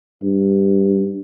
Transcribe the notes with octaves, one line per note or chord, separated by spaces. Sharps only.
G2